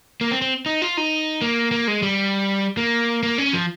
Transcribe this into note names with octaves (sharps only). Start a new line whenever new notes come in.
A#3
C4
C4
D#4
F4
D#4
A#3
A#3
G#3
G3
A#3
A#3
C#4
F3